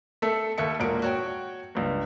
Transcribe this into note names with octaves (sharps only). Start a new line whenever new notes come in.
A3 A4 E5
D#2 A4 E5 C#7
E1 A#2 A#3 F#5 D7
F#4 C#5 G5
C#2 G2